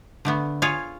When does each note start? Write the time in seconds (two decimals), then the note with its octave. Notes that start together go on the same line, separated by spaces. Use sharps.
0.25 D3 A3 B3
0.62 F4 G#4 C#5 F5